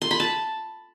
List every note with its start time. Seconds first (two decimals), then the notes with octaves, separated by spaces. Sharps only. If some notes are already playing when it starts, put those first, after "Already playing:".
0.02 C6
0.11 B5
0.20 A5